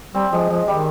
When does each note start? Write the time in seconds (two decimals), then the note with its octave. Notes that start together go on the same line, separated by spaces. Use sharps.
0.14 G3 C4
0.32 F3 G#3
0.49 F3 G#3
0.68 D#3 G3